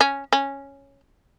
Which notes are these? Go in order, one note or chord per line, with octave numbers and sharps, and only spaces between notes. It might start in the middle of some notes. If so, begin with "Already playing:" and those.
C#4
C#4